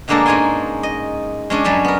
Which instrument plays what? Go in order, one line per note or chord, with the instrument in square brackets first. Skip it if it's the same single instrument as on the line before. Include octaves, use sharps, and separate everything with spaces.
[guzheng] B2 D3 G#3 A#3 D4 A4
G#2 C#4 G#4 G#5 C6
D#5
G#3 C#4 D4
F#2 G3 A4 C#5
B3 A#4